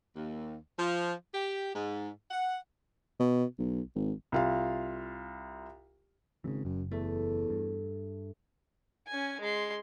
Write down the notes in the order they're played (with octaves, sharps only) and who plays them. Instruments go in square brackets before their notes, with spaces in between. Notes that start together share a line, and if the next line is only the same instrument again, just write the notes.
[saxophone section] D#2
F3
G4
G#2
F#5
[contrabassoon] B2
B1
G#1
[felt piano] C2 F4 F5
[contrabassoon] G#1 [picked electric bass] C#3 E3
[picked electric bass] F#1 [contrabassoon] F#2
[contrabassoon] E2 [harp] A3
[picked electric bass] G2
[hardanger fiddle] C#4 G#5
G#3 C6